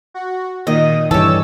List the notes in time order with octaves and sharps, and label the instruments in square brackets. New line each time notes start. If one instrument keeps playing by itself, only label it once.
[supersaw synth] F#4
[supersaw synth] A#2 D#3 D#6 [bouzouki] D#5
[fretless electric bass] G2 E3 [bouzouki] G4 A4 [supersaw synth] C#5 E6